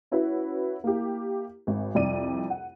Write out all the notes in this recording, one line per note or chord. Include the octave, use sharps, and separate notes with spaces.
C#4 E4 F#4 B4
A#3 E4 G4
G#1
C2 F2 D5 D#7
F#5